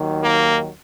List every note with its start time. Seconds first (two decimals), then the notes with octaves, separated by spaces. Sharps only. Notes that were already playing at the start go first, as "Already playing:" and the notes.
Already playing: D#2 D#3 F#3
0.22 A#3